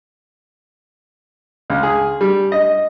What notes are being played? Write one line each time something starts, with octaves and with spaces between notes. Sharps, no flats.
C#2
G#4
G3
D#5